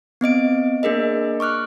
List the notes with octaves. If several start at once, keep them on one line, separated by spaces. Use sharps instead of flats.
B3 C4 D#5 D7
A#3 D4 G#4 A#4 D#5
C#6 D6 F6 F#6